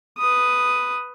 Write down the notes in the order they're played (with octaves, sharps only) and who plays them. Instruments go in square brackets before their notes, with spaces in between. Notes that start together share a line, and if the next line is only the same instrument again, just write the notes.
[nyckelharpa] B4 D#6